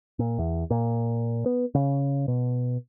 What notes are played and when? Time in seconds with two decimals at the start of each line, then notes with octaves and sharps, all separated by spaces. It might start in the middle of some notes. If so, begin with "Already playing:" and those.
0.19 A#2
0.39 E2
0.70 A#2
1.46 B3
1.75 C#3
2.28 B2